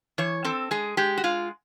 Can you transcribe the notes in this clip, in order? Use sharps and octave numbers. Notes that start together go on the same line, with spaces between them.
E3 C#5
C4 A4
G#3 G#4
G#3 G4
F#4
G#3 F4